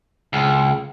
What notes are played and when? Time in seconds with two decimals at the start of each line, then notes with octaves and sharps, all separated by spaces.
0.33 C#2